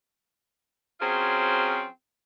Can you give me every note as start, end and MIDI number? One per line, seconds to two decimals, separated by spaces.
1.01 1.84 54
1.01 1.84 60
1.01 1.84 61
1.01 1.84 65
1.01 1.84 68
1.01 1.84 72